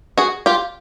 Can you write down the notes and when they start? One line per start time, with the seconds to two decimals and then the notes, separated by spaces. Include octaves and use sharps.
0.18 F#4 G#4
0.46 F4 G4